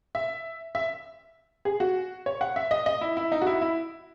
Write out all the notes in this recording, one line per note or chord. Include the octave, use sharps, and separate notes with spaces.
E5
E5
G#4
F#4
C#5
F#5
E5
D#5
D#5
E4
E4
D#4
F#4
E4
E4